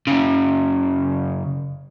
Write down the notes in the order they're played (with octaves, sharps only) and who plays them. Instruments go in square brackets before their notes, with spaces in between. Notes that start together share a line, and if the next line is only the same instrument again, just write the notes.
[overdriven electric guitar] F#2 C#3